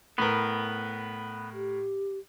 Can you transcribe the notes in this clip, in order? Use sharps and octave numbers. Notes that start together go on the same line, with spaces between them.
A2 B3 A#4
G4